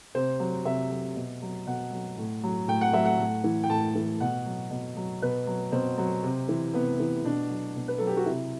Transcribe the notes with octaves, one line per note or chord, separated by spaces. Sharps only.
C3 C5
F#3
C3 E5
F#3
B2
F#3
B2 F#5
F#3
A2
F#3
A2 G5
F#5
F#3 E5
F#5
A2
E3
G5
A2 A5
E3
B2 F#5
F#3
B2
F#3
B2 B4
F#3
B2 C4
F#3
C3
E3
C3 B3
E3
B2 D4
F#3
B2
B4
F#3 A4
G4
F#4
C3 E4